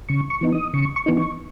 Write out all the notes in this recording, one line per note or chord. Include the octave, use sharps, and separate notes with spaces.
C#3 C#6
C#6
E3 B3 D#4
D#6
C#3 C#6
C#6
E3 B3 D#4
C#6